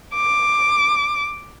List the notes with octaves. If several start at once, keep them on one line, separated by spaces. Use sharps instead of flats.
D6